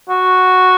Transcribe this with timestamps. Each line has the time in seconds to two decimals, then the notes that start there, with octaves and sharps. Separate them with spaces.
0.09 F#4